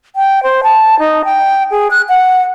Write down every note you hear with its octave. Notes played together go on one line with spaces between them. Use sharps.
G5
C5
A5
D#4
G5
G#4
F#6
F#5